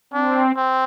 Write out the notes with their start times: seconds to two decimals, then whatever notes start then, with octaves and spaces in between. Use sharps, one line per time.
0.13 C4 D4
0.56 C4